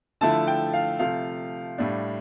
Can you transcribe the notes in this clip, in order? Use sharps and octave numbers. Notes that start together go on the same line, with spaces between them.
D3 F3 A3 E4 A5
G5
F5
C3 F3 A3 F5
A2 G3 D4